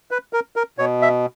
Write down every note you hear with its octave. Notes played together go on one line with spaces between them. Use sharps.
B4
A#4
A#4
B2 C#5
E5